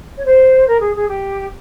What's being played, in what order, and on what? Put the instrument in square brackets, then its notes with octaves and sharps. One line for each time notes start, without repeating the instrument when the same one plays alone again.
[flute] C#5
C5
A#4
G#4
G#4
G4